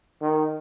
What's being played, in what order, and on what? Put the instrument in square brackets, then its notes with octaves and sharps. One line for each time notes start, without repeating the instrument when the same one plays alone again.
[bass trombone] D#3